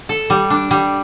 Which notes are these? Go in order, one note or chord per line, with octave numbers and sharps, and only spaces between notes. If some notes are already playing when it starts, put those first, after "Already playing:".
A4
G3
D4
G3